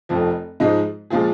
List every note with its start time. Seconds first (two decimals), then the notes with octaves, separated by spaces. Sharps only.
0.09 F1 F2 F3
0.60 G#2 F3 G#3 D#4
1.10 A#2 F3 G#3 F4 G#4